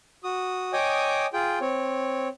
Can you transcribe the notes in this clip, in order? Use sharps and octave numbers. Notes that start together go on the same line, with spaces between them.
F#4 D#6
C#5 D#5 G5 G#5 D6 D#6
F4 G#4 G5
C4 C#5